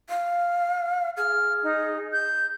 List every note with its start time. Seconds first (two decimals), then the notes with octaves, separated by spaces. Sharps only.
0.09 F5
1.17 G#4 F6
1.63 D#4
2.13 G6